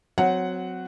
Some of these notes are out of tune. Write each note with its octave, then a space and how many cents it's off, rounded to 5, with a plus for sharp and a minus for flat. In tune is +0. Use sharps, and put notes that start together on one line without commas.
F#3 -10 C4 -25 F#5 +0